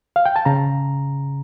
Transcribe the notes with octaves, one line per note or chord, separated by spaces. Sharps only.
F5
G5
A5
C#3 A#5